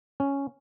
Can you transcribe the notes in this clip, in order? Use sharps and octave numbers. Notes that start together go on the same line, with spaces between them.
C#4